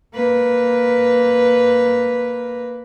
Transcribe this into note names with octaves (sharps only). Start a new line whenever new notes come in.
A#3 B4